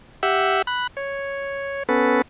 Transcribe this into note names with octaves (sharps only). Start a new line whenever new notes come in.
G4 E5 F#5 E6
B5 F#6
C#5
B3 C#4 A4 B4